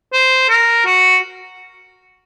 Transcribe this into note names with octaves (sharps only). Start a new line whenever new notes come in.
C5
A#4
F#4